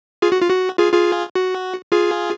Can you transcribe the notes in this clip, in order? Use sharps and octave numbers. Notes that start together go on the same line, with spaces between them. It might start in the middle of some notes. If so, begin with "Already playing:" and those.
F4 G#4
F#4
F4
F#4
F4 G#4
F4 G#4
F#4
F4 G#4